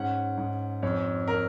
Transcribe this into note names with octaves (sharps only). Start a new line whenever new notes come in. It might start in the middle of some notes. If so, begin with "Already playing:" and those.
Already playing: G#2 C#4 F#5
G#2
F2 C#5
A#4